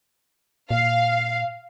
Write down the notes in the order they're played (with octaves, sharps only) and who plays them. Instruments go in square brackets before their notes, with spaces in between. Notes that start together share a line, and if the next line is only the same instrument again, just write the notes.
[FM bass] A#2 [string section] F5